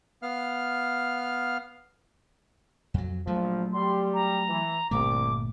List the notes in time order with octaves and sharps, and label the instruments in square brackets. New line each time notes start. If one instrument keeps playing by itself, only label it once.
[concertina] B3 F5 F6
[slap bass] F2 F#3
[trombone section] A#1 F3 [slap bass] F#3 A3
[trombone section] G3 [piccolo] C6
[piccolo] A#5
[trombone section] E3
[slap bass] G1 A#2 A3 [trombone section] C2 [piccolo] D6